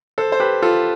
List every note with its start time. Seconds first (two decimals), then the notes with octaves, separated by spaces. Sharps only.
0.18 A4 C5
0.32 C5
0.40 G4 B4
0.62 F4 A4